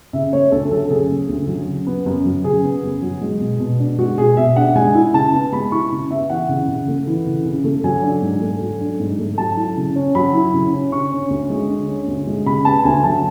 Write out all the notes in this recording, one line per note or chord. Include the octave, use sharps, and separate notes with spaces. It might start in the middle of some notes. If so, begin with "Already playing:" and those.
C#3 E5
A3 C#5
D2 A4
F#3 A4
C#3 G#4
A3
D2
F#3
C#3
B3
F#2
F#3
C#3 G#4
B3
F#2
F#3
G#3
B2
B2
D4
G#3 F#4
B2 G#4
B2 E5
D4 F#5
G#3 G#5
E4
C#3 A5
B3
G#3 B5
E4 C#6
C#3
B3 E5
E3 F#5
C#3
C#3
A3
E3
C#3
C#3
A3
F#3 G#5
D4
G#2
A3
F#3
D4
G#2
A3
F#3 A5
E4
C#3
C#4
F#3 B5
E4
C#3
C#4
D3 C#6
C#4
D2
G#3
D3
C#4
D2
G#3
C#3 B5
B3 A5
D2 G#5
F#3 A5